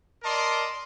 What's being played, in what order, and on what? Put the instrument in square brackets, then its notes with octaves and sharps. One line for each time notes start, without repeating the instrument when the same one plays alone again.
[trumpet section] A#4 D5 D#5 A5 C6